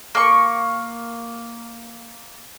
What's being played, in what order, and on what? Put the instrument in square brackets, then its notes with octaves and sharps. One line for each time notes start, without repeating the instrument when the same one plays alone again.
[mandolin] A#3 C#6